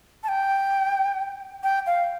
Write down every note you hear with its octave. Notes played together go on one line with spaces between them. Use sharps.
A5
G5
G5
F5